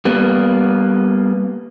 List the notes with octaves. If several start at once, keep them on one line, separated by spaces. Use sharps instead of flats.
G3 A#3 B3